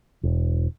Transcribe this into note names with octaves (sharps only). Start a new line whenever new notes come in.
E1